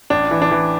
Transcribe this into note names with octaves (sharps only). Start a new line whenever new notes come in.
A1 D4
E3
D4
E3